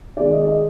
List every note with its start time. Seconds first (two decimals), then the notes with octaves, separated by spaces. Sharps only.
0.16 D#3 G#3 D5
0.33 D#5
0.47 D#5